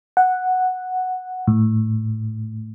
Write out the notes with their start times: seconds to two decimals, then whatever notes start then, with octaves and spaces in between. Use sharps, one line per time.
0.17 F#5
1.47 A2